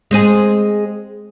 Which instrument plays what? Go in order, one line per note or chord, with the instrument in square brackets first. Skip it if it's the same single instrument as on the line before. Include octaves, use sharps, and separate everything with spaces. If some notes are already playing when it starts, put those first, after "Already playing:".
[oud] G#3 C4 G#4